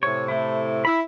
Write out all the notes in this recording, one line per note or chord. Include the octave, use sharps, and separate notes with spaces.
A2 C3 C#5
A3 E4
E4 B5 E6